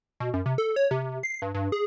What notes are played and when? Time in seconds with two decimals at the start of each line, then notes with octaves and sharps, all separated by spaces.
0.20 B2
0.34 F#2
0.46 C3
0.58 A4
0.76 C#5
0.91 C3
1.23 C7
1.42 G2
1.54 G2
1.72 G#4